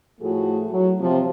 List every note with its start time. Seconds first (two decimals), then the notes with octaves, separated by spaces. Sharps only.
0.21 A2 F3 A3 F#4 G#4 A4
0.71 F#3
1.01 C3 F3